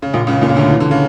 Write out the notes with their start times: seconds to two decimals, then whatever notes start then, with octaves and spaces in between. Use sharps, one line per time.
0.02 C#3
0.14 A#1 A#2
0.27 C#2 C#3
0.41 A#1 A#2
0.49 C#3
0.56 D2 D3
0.70 E3
0.80 D3
0.91 C#3